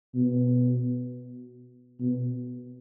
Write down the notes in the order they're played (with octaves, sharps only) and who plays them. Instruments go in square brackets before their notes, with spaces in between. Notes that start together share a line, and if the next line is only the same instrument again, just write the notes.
[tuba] B2
B2